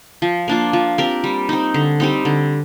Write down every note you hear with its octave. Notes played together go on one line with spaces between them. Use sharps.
F3
A#3 D4 F4
F3
C4 G4 A#4
G3
C4 D#4
D3
G3 C4 D#4
D3